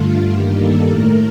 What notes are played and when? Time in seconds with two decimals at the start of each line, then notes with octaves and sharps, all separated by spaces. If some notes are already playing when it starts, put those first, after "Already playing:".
Already playing: G2 D3 A3 F4
0.31 G2 D#3 G3 A#3 G4
0.59 A4
0.87 A2 A3 A#4